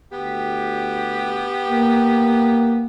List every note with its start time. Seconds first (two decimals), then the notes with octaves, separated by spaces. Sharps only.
0.12 D2 B3 G4
1.69 A#3